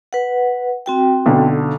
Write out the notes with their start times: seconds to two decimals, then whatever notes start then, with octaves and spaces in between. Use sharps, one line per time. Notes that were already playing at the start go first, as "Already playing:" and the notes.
0.13 B4 F#5
0.86 C4 F#4 G5
1.26 B1 D3